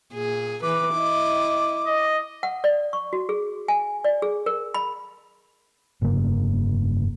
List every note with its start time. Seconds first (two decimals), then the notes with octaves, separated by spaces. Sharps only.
0.14 A#2 G#4
0.63 E3 B4 D6
0.94 E4 D#5
1.86 D#5
2.43 F#5
2.64 D5
2.93 C#6
3.13 F#4
3.29 G#4
3.68 G#5
4.04 D5
4.22 G#4
4.46 A#4
4.74 B5
6.02 F1 G2 C#3 A#3